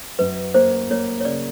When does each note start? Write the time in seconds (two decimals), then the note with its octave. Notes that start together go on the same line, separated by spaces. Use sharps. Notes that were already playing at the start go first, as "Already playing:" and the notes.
0.19 F#2 B4
0.54 A#3 C5
0.90 A#3 C#5
1.21 C#5
1.25 C#3 D5